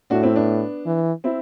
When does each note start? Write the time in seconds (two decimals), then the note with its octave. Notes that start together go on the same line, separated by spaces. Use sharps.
0.10 A2 D4 F#4
0.23 C4 E4
0.36 B3 D4
0.86 E3
1.24 C4 E4